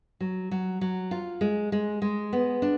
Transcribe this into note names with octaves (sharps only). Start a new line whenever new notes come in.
F#3
F#3
F#3
F4
G#3
G#3
G#3
B3
D4